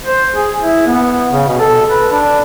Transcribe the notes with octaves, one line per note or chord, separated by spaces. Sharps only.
C5
G#4
E4
B3
C#3
B2
A4
B4
D4